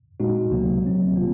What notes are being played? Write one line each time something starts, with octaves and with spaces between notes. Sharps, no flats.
A#2 G#3 D#4 F#4
C#2 C3 F#3 A#3
C3 F#3 C4
C3 D#3 A#3 F4